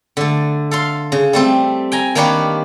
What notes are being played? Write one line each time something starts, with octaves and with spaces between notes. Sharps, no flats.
D3 A3
A4 F5 C6
C#3
G3 A3 C4
G5 G#5 A#5
D#3 A#3 D4 G4 B4 C#5